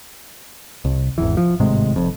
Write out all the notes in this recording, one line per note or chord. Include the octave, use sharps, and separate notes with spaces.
C2
G#1 E2 E3
F3
G#1 A2 C3 G#3
F1 F2